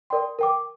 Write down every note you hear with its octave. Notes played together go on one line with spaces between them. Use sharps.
A#4 D5 G5 C6
A#4 G5 D6